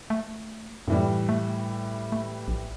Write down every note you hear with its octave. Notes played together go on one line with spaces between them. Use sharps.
A3
F#2 A2 E3 G3
A3
A3
A#1